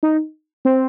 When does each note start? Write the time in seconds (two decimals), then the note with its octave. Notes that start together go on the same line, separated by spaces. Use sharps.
0.03 D#4
0.65 C4